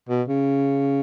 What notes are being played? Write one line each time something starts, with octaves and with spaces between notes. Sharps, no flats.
B2
C#3